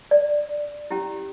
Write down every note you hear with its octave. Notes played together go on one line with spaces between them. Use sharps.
D5
C#4 E4 G4